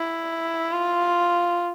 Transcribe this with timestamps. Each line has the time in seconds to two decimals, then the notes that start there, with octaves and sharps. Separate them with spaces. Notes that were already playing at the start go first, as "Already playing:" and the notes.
Already playing: E4
0.72 F4